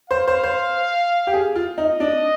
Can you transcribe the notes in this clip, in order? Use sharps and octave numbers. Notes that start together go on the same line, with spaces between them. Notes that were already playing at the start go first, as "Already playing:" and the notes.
C5 F5
C5
C5
G4
G#4
F4
D#4 D#5
D4